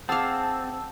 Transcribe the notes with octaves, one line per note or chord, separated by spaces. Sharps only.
C4 G#4 F5 F#5 A5 D6 E6